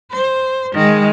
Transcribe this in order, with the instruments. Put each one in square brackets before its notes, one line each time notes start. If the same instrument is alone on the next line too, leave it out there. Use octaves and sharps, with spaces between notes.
[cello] C5
D#3 G#3